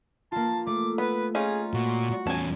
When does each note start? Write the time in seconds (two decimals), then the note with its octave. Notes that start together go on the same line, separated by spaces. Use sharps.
0.32 A#3 F4 A5
0.67 A3 D6
0.98 B3 B4
1.35 C#4 D#4 F4 G#4
1.74 A#2 F#4
2.27 E2 C#4 G#5 A5